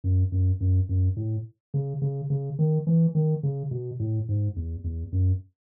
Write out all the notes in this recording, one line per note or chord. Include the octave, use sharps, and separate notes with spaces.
F#2
F#2
F#2
F#2
A2
C#3
C#3
C#3
D#3
E3
D#3
C#3
B2
A2
G#2
E2
E2
F#2